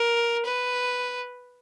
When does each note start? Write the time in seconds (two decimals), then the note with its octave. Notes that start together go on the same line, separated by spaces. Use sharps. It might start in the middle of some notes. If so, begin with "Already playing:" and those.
Already playing: A#4
0.45 B4